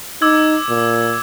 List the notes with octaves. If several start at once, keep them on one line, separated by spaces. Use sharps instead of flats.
D#4 D6 E6 G#6
A#2